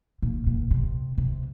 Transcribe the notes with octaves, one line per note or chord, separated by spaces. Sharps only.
A#2
A#2
C3
C3